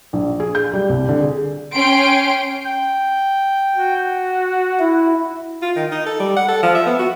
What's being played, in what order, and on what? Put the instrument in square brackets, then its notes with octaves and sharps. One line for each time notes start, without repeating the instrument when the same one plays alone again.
[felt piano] A#1
G#4
G6
G3
C2
D3
G#4
[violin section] C#4 G5 C6 D7
[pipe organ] G5
[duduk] F#4
[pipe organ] E4
[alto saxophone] F4
D#3
D#4
A4
G3
F#5
A4
F3
E5
B3
F#4